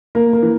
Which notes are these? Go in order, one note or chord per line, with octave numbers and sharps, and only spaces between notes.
A#3 A#4
A#3
E3